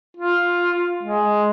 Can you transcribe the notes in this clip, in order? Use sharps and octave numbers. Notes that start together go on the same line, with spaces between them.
F4
G#3